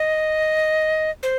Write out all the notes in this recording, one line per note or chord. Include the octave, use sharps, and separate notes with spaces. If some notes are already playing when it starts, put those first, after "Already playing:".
Already playing: D#5
C5